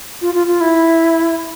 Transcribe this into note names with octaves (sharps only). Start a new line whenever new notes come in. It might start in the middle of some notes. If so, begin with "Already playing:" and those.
F4
F4
F4
E4